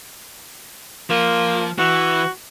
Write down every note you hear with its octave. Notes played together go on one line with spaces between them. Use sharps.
F3 A#3
E3 F#4